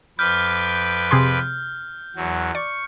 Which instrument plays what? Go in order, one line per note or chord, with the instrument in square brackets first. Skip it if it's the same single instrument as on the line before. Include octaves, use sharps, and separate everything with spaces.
[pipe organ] F2 B4 D6 [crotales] F6 G6
[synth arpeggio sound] C3 G#4 C6
[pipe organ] E2 F#3
[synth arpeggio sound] D5 [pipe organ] C#6